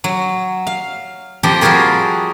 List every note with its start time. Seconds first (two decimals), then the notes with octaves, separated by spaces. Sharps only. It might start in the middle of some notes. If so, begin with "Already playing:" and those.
0.04 F#3
0.67 F5
1.43 F2 F3 G4 G5 A#5
1.61 F3 G3 F4 F#4 G#4 A#4